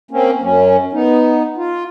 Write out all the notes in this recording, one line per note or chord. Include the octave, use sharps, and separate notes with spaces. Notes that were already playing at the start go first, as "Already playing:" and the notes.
A#3 C4 C#4
F#2 F#3 C#4
B3 D#4
F4